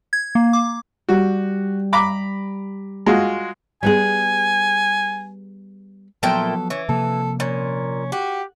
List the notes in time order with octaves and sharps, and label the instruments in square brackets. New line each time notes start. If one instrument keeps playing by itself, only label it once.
[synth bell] G#6
A#3
D6
[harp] G3 G4 [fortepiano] F#4
[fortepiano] A#5 B5 D6
G#3 F4 F#4
[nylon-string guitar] G3 B3 G#4 [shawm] G#5
[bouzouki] A#2 E4 G5 [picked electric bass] F3 F#3 B3 [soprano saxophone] A4
[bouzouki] E3 [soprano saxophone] C#4
[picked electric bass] C3 F3 A#3 [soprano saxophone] A4
[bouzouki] A#2 [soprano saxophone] C#4
[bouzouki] F#4 [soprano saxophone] G4